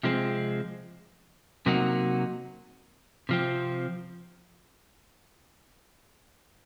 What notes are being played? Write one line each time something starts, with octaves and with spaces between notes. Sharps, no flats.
C3 F3 G#3 C4
C3 F#3 A#3 D#4 F#4
C3 F3 C4